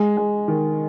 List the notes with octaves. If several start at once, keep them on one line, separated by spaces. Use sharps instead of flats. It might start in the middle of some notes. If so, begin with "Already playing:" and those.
Already playing: G#3
G#3
D#3